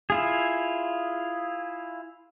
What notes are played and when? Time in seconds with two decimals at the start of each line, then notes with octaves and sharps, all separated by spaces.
0.10 E4 F4 G#4